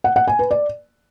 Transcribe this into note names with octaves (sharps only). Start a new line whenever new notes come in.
F#5
F#5
G#5
B4
D5